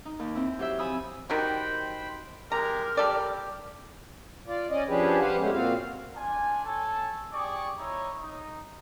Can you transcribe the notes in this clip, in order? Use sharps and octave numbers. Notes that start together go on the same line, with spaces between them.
D#4
D#2
C4 E4
F#3 G4 C5 E5
F3 G#5 B5 D#6 E6
D#3 G3 F#4 C5 G5 B5
G#3 G4 A#4 A#5
G3 G4 A4 D5
F4 D5
C#4 D5 D#5
F3 C#4 D4 G4 G#4 B4
G4 B4 C5 F5 F#5
G#3 A3 B3 C#4 G4
A#2 C4 F4 F#4 F5
D4 F4 G#5
A4 C#5 G#5 A5
G4 G#4 D5 C#6 D6
D#4 E4 C#5
D#4